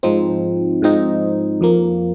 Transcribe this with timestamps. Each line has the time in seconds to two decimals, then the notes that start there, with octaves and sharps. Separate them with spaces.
0.03 G#2 F3 C4 D#4
0.82 G#2 F3 C4 D#4
1.61 F2 F3 A#3